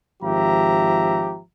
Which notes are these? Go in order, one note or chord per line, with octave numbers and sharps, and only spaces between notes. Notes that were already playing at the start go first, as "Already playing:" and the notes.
G#1 F3 G4 E5 A#5